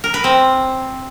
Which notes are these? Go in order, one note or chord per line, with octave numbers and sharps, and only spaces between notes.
A#4
B4
C4